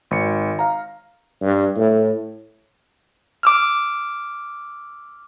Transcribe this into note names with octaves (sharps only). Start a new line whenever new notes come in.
G#1 C#7
F5 A#5
G2
A2
D6 E6 F6